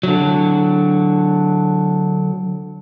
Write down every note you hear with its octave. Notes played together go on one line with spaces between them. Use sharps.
D3 F#3